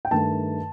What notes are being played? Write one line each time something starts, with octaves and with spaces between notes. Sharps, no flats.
G5
G2 D#3 A3 A5